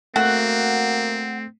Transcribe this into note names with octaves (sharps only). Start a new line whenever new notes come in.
A3 A#3 C4 F#4